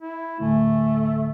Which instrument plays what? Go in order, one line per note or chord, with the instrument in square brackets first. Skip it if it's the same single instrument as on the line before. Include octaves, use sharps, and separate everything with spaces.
[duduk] E4
[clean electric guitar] D2 A2 G#5 [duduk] A3